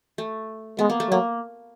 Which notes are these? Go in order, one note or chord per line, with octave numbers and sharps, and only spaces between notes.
A3
G#3 B3
A#3
A3
F#3 A#3